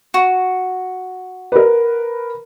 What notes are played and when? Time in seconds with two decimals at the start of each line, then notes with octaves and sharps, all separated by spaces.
0.14 F#4
1.52 A#4 B4